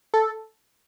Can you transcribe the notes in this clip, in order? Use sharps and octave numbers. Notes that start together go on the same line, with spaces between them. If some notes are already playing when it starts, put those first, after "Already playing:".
A4